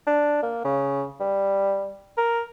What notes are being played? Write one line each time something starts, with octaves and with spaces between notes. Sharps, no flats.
D4
A#3
C#3
G3
A#4